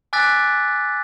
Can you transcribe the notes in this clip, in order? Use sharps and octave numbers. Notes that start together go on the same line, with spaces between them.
G#5 D6 E6 F#6 A6 B6